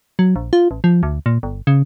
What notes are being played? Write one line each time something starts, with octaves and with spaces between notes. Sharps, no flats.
F#3
A#1
F4
A1
F3
D2
A#2
G1
C#3